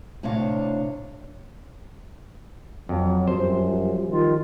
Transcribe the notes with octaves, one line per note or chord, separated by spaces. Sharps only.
A2 C3 D4 C#5 F5
F2 F#3
F#2 F3 G3 C5
D#3 F4